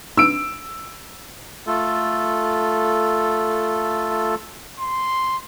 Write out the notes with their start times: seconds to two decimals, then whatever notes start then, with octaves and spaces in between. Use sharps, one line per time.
0.18 E6 D7
1.67 A3 F4 A4
4.80 C6